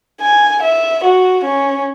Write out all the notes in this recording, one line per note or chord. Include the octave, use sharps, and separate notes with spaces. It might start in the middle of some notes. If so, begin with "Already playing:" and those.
G#5
E5
F#4
C#4